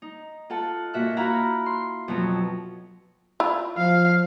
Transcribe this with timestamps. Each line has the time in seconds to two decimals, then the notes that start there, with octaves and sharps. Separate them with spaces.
0.02 D#4
0.50 F4 A4 F#5 A5
0.93 A#2 F#4 E5 F#6
1.16 E4 F#4 F5 F#5 A#5 B5
1.66 C6
2.08 F2 B2 F#3
3.40 E4 F4
3.78 F3 F5